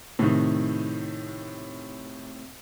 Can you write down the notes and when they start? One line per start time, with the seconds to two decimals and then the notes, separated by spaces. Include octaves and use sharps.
0.19 A2 C3 D#3